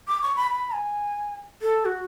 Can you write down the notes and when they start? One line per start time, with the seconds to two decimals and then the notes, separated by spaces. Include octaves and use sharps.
0.08 D6
0.22 C#6
0.37 B5
0.51 B5
0.74 G#5
1.62 A4
1.85 F#4